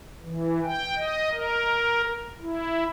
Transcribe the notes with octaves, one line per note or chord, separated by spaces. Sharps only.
E3
G5
D#5
A#4
E4